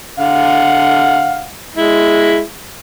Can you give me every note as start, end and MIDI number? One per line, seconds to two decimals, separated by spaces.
0.19 1.47 50
0.19 1.47 77
0.19 1.47 78
1.76 2.41 56
1.76 2.41 64